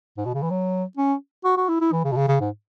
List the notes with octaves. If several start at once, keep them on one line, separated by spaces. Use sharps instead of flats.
G#2
B2
C#3
E3
F#3
C#4
F#4
F#4
E4
E4
E3
C#3
B2
C#3
C#3
G#2